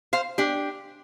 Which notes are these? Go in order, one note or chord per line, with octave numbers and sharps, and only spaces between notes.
C5 F5
D4 G4